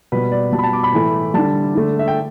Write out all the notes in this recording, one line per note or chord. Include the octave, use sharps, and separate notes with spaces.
B2 G3 B4
D5
B2 G3 A5
B5
A5
D6
B5
A2 E3 A3
D3 G3 A5
D3 A3
E5
G5